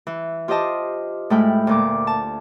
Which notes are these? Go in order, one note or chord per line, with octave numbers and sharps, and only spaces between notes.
E3
F4 G4 C5 D#5 A5
A2 G#3 A3 G5 B5 F6
D2 A#2 D6
A5